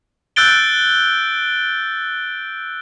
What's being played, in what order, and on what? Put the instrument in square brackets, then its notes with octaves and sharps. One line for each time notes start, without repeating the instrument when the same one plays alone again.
[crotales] E6 F#6 G6 A6 D7 G7